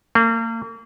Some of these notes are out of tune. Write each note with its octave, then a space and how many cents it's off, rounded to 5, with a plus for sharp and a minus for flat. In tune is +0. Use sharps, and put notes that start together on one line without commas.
A#3 -35